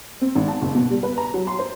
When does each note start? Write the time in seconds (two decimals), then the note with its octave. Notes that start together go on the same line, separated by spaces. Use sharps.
0.21 C4
0.35 G#1
0.48 A5
0.62 F#1
0.75 B2
0.91 G3
1.03 B4
1.18 A#5
1.34 F#3
1.47 C6
1.59 C5